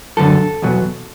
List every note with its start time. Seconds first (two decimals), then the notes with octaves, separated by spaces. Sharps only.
0.17 F#2 D3 F#3 A4
0.62 E2 B2 F#3